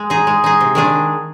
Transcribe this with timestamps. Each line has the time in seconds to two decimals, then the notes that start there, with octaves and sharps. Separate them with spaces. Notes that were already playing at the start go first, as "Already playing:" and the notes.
Already playing: G#3
0.10 D#4 G#4
0.27 G#3
0.44 D#4 G#4
0.61 C3
0.75 D#3 G#3 D4 G#4